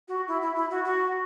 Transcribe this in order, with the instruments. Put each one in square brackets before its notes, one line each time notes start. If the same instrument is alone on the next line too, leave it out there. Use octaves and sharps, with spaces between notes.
[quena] F#4
E4
E4
E4
F#4
F#4